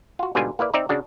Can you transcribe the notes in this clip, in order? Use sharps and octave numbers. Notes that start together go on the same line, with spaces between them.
F4 F#4
G#2 B2 D3 G3 F4 G#5
A#3 E4 B4 D5
C4 D#4 D5 E5 A#5
C#3 D4 F#4